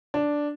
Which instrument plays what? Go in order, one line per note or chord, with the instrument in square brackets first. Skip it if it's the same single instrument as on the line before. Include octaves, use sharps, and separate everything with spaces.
[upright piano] D4